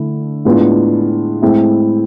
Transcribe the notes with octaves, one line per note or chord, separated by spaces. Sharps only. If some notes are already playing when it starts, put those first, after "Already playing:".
Already playing: D3 A3 E4
A2 G#3 B3 D4 F4
A2 G#3 C4 E4